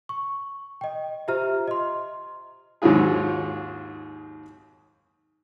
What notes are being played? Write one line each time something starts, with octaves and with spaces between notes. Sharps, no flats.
C#6
D#5 G5
F4 G4 C5 E5 A#5 F6
D#5 C6
D#2 G#2 D#3 F#3 F4 G#4